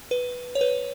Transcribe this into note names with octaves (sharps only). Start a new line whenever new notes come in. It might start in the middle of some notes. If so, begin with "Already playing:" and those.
B4
C#5
B4